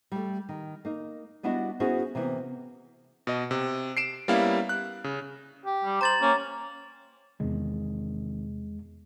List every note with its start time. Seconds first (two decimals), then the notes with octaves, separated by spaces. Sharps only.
0.12 G3 A3
0.49 D#3
0.85 A#3 D#4
1.43 G3 B3 D4 E4 F#4 D#5
1.80 B3 C#4 E4 F#4 G#4 C5
2.15 C3 E3 A#3 B3
3.27 B2 D#5
3.51 C3
3.97 C7 D7 E7
4.28 G3 A#3 B3 C#4 E4 F5
4.69 F#6
5.04 C#3
5.66 G4
5.85 G3
6.01 C5 A#5 A6 F#7
6.22 A#3 C#4
7.40 E2 C3 D#3 G#3